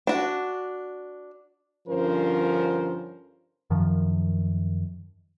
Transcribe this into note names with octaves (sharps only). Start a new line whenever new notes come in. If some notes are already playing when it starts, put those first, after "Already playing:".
D4 F#4
G2 D3 F3 C#4 A#4 C5
F#2 D#3 F3